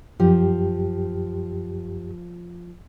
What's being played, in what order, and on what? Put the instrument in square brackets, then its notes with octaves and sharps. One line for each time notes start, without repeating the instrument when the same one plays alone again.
[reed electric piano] F#2 G4 [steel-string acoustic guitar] F3